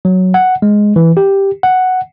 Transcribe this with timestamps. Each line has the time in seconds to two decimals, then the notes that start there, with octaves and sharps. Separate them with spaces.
0.05 F#3
0.34 F#5
0.62 G#3
0.96 E3
1.17 G4
1.63 F#5